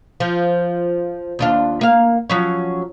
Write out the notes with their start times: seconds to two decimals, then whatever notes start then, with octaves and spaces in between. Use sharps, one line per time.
0.20 F3
1.39 D#2 D4 F4
1.81 A#3 F5
2.30 F3 F#3 C#4